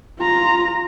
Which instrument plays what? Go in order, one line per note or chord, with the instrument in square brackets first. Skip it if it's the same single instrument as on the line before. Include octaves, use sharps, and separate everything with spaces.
[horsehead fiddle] F4 A#5